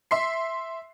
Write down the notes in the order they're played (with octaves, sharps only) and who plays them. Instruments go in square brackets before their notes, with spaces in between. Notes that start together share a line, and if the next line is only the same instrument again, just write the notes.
[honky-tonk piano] E5 C6 C7